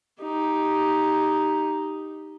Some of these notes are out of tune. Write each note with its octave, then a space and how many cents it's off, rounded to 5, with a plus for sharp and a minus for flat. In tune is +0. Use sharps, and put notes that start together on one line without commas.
D#4 +0 G4 +0